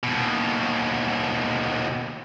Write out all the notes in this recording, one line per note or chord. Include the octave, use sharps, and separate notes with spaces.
D#2 B2